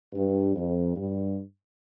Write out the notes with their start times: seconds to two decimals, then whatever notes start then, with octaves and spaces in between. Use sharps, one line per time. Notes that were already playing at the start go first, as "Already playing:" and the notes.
0.13 G2
0.55 F2
0.96 G2